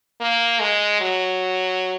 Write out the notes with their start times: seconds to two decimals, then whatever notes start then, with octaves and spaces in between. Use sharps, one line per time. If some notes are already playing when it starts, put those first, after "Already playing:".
0.20 A#3
0.60 G#3
1.01 F#3